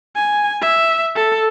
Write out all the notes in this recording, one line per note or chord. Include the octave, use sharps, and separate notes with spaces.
G#5
E5
A4